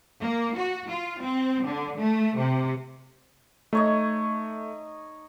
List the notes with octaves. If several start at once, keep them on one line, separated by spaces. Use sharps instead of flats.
A#3
F#4
F4
C4
D3
A3
C3
A3 D#4 C#5 D#5